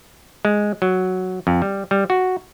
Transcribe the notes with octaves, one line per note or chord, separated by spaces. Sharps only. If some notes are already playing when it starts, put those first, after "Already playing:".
G#3
F#3
F2
G3
G3
F#4